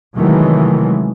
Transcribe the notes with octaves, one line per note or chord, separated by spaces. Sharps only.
C3 D#3 E3 F#3 G#3 A3